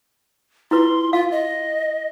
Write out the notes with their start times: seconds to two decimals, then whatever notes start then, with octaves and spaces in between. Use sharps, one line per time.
0.71 E4 F4 B4 C6
1.13 F4 F5
1.31 D#5